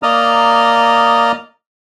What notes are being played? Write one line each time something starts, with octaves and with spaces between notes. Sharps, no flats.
A#3 D5 D#5 A#5 D#6 F6